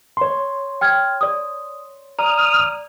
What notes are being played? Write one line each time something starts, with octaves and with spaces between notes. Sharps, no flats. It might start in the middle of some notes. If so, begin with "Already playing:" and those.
C#5 C6
G5 F6 G#6
D5 D#6
D5 A#5 D#6 F6